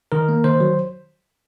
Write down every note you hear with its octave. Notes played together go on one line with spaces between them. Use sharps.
D#3 A#4
A#3
D#3 C5
F#3